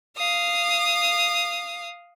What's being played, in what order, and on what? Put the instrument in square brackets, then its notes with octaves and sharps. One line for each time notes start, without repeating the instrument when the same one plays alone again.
[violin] F5 D#6